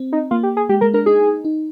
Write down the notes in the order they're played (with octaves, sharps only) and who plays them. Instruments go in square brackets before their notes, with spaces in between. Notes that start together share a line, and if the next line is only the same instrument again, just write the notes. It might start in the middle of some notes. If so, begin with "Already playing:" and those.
Already playing: [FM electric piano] C4
[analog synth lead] D#4
[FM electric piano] A#3 [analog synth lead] F4
[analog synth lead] G4
G#4
[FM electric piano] G#3 [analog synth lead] G4
[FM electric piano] G#3 [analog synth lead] A#4
[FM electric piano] D4 [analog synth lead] A#4
[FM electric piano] D#4 [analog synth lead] G#4
[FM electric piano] D#4